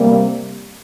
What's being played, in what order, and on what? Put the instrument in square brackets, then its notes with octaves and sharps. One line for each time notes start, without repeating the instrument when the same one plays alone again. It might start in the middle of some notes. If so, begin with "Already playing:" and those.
Already playing: [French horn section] C3 G3 A#3